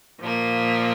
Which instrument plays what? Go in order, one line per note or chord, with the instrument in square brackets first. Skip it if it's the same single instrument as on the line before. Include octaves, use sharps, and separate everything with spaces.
[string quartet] A#2 F3 A#3